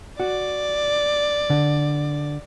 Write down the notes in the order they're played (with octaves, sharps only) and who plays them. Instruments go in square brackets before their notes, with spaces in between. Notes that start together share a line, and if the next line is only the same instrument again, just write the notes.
[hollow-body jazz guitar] F#4 [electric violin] D5
[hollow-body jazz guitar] D3